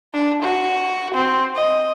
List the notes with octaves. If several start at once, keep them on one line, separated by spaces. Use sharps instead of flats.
D4
F#4
C4
D#5